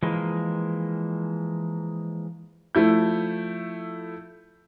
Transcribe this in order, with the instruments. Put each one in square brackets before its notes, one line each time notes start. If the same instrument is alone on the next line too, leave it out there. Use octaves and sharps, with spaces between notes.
[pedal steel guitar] E3 F3 G#3 A#3
[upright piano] F3 A3 E4 G6